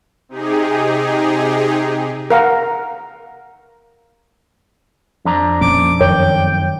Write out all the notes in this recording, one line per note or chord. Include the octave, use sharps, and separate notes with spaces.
C3 D#4 G4 G#4
A#4 F5 F#5 A#5
F2 D4 A#5
A#2 F3 C#4 D6
F#2 D#3 A#4 C#5 G5